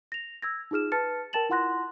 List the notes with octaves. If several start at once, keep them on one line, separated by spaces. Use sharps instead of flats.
A#6 F7
E6 G#6 A#6
D#4 F4 G#4 F6 E7
B4 A5 F6 A6 C#7
A#4 G5 A5 A6 E7 F#7
E4 F4 F#5 C6 F#6 A#6